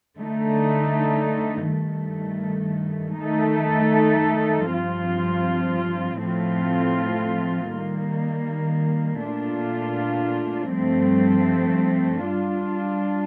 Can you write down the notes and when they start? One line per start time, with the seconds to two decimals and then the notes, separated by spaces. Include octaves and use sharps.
0.17 D3 A3 D#4
1.68 G2 D#3 A3
3.19 D#3 A3 D#4 A4
4.70 G2 F3 C4 F4
6.21 A2 F3 A3 C4 F4
7.71 D#3 G3 A#3
9.22 A#2 A3 D4 F4
10.73 G2 F3 A3 C4
12.24 G3 D4 F4